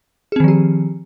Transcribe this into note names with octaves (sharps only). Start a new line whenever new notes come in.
D#3 F3 C4 G4 G#4